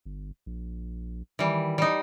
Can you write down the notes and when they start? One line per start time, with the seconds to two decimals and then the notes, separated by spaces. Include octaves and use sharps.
0.06 G1
0.46 A#1
1.39 D#3 E3 G3
1.78 G3 D#4